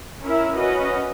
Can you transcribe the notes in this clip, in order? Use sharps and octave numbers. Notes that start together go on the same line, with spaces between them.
C#4 E4 A#4 E5
C#4 F#4 B4 D#5